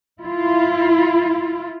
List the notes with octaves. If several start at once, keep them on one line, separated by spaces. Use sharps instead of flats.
E4 F4